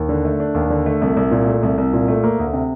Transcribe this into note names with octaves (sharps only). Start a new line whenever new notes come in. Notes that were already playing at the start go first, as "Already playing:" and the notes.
Already playing: D#2
D3
A3
D4
D#2
D3
A3
C2
C2
A#2
A3
C2
C2
A#2
A3
A#3
D2
C3